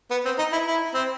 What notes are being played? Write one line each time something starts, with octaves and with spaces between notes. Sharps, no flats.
B3
C4
D#4
E4
E4
C4